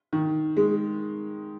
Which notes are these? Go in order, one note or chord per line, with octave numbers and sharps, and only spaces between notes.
D#3
G#3